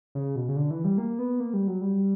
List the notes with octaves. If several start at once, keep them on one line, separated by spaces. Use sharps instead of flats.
C#3
B2
C#3
D3
E3
G3
A#3
B3
A#3
G3
F#3
G3